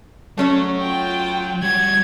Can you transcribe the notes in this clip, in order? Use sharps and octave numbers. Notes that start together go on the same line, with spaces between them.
F#3 A3 C#4 C#5
F4 G5
G3 F#4 G#6